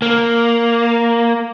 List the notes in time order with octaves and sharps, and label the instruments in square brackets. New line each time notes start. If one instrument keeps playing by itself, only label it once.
[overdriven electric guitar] A#3